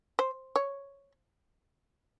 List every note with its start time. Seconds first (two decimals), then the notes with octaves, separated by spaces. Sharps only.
0.19 C5
0.56 C#5